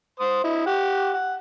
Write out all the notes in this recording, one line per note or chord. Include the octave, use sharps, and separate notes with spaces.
C5 D#6
E4 D#5
G4 F#5
F#5